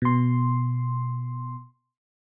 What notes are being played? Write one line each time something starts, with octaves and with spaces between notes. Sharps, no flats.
B2 C6